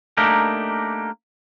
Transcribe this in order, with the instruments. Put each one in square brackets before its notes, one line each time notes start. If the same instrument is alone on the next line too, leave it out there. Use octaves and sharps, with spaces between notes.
[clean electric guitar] A3 A#3 D4 D#4 G4 A#4